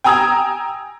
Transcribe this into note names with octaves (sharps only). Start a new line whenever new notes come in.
G5 G#5 A#5 D#6 E6 G#6